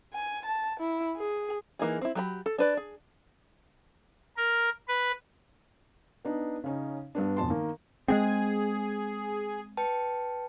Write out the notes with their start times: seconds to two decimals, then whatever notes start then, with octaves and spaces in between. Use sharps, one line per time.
0.14 G#5
0.46 A5
0.80 E4
1.17 G#4
1.79 E3 A#3 D#4 G#4
2.01 C4 E4
2.15 F#3 G4 B5
2.46 A4
2.58 D4 B4 D5
2.77 G#4
4.37 A#4
4.88 B4
6.25 B3 D4 D#4
6.64 C#3 C#4 D#4
7.15 G2 B3 D4
7.37 E1 F2 A5 C6
7.50 D#3 A#3
8.08 G#3 B3 C4 G#4
9.77 B4 G5 A5